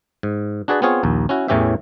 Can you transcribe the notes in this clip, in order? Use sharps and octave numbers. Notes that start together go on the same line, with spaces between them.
G#2
D4 F#4 G#4 B4 D5
B3 C4 F4 G#4 C#5
A#1 D#2
C#4 E4 F#4
E2 A2 E3 C#4 G4 E5